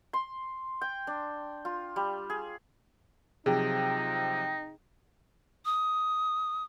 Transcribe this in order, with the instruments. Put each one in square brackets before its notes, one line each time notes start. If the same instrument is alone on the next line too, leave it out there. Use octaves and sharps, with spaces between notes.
[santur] C6
G5
D4
F4
G3
G#4
[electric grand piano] C3 F3 F#3 [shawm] D#4 [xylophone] G#4 [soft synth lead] G5
[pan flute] D#6